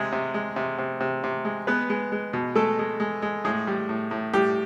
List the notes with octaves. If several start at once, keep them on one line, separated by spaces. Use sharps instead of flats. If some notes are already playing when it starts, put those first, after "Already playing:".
Already playing: C3 G#3 G#4
C3
G#3
C3
C3
C3
C3
G#3
G#3 B3 B4
G#3
G#3
B2
G#3 A3 A4
G#3
G#3
G#3
A2 G#3 G#4
G3
A2
A2
A2 G3 G4